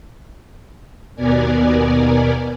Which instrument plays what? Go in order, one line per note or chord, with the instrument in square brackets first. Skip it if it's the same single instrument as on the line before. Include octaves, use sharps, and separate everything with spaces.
[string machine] D#2 B2 B3 A#4 D5 G#5